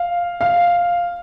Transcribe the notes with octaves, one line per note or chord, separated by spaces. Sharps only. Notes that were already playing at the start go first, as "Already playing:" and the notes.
Already playing: F5
F5